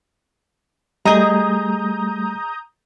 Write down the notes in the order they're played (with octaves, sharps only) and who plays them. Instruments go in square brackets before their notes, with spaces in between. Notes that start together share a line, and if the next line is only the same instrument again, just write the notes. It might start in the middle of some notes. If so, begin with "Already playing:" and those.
[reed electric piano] G3 A3 [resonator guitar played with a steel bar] G#4 D#5 [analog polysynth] A#5 D#6 G6